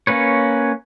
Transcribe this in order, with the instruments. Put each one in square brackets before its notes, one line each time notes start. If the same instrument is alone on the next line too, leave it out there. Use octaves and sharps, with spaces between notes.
[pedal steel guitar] A#3 C#4 B4 C#5